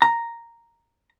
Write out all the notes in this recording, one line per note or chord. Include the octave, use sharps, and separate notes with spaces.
A#5